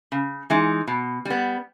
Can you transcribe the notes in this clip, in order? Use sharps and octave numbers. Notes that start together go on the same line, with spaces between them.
C#3
E3 G#3 D#4
B2
G3 B3